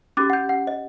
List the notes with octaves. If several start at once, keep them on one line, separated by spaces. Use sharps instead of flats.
C#4 F#4 G4 D6 A6
F#5 G6
F#5
D#5